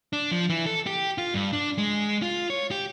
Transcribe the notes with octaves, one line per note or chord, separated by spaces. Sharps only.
D4
F3
E3
A4
G4
F4
G2
D4
G#3
F4
C#5
G4